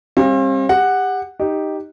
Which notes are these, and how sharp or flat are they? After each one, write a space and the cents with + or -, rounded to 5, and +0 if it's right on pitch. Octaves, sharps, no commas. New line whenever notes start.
G3 +25 C4 +40 F5 +0
G4 +30 F#5 +0
D#4 +0 G4 +0